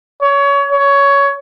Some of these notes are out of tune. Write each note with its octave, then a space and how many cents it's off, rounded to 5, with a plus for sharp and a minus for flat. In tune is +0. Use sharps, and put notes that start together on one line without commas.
C#5 +25
C#5 +15